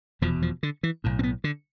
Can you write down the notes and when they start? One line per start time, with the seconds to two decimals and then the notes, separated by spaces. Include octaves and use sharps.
0.21 F1 E2 B2 F3
0.42 F3
0.63 D3
0.83 E3
1.04 B1 A2
1.19 C4
1.23 B3
1.44 D3